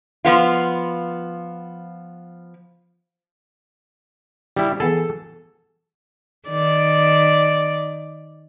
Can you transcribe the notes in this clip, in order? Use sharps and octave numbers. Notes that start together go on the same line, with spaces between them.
F3 B3 F4
G3 E4
E3 B3 G#4 A4
D#3 D5